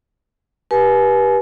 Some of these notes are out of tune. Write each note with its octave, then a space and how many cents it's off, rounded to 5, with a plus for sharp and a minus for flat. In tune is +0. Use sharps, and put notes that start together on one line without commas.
G4 -5 B4 -30 G#5 +35